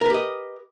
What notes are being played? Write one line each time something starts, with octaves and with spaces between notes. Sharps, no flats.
G4 A#4 B4 D#5